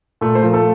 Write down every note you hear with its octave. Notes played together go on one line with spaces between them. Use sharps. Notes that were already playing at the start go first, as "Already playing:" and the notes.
A#2 A3 A4
C5
F3 A#4
A3 A4